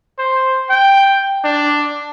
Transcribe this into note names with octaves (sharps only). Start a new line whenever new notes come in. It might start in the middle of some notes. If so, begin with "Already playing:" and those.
C5
G5
D4